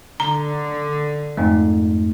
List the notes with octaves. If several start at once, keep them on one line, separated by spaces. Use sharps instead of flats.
D3 A#5
F2 G#2 A3